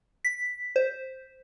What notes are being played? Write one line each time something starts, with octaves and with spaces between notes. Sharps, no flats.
B6
C5